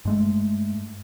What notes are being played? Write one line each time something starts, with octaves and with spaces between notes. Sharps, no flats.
G2 G#3 A3